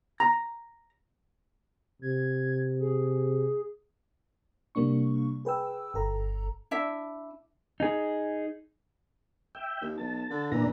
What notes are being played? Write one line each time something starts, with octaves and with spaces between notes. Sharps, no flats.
A#5
C3 G#6
G#4
C3 G3 A#3 D4 C#6
G#4 B4 G5 E6
G1 A4 A#5
D4 E4 E5
D#4 G#4
E5 G5
D#2
B1 A5
D3
A#2 E3 D4 A#5